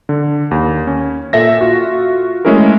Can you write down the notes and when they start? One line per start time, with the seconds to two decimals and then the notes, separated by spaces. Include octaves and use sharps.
0.09 D3
0.51 D#2
0.87 C#4
1.33 A#2 A4 E5 A#6
1.61 F4 F#4
2.45 G#3 A3 C#4 E4 G#4 A#4